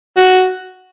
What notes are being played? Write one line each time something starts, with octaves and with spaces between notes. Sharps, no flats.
F#4